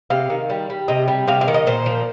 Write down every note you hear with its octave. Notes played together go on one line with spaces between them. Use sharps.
C3 F5
D#3
G3
G3
C3 D#5
G3
C3 F5
F5
D#3
D#5
A#2 C5
F3